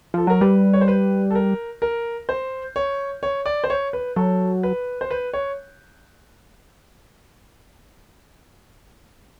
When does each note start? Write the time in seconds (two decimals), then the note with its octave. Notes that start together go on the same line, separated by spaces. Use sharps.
0.14 F3 A4
0.27 F#3 A#4
0.41 G3 B4
0.73 C#5
0.81 C5
0.88 B4
1.31 A4
1.35 A#4
1.82 A#4
2.29 C5
2.76 C#5
3.23 C#5
3.46 D5
3.64 C5
3.70 C#5
3.93 B4
4.16 F#3 A4
4.63 B4
5.01 C5
5.11 B4
5.34 C#5